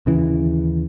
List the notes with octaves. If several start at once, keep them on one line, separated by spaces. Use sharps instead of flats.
D#2 C#3 E3